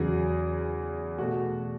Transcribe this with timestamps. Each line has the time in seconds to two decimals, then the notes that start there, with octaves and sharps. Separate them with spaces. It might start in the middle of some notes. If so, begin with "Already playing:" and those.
Already playing: E2 C#3 F#3 G#4
1.18 B2 A3 F#4